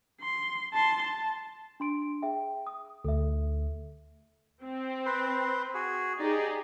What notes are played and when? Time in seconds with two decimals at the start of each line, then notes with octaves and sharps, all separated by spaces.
0.21 C6
0.73 A5 C6
1.02 A5
1.80 D4 C6 D7
2.22 G#4 E5 G5
2.67 D#6
3.05 D2 A4 E5
4.63 C4
5.06 B4 C5 C6
5.74 F#4 G#4
6.19 D#4 G4 G#4 D5